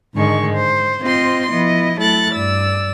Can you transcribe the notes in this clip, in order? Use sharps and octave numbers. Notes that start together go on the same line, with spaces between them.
G#2 D3 D#3 G#3 C#6
C5
C4 F4 C5 D#5 C6
F3 B3 E4 D#5
F#3 A3 E4 A4 F#6 A6
G2 D5 E6